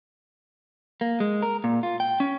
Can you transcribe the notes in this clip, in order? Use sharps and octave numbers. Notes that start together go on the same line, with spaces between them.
A#3
G#3
A#4
A#2
F4
G5
C#4